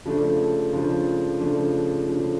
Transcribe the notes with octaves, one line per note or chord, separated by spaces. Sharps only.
C#3 F3 A3 D4
C#3 F3 A3 D4
C#3 F3 A3 D4
C#3 F3 A3 D4